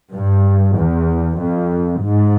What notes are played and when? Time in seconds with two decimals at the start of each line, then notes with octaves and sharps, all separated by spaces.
0.13 G2
0.76 E2
1.39 F2
2.03 G#2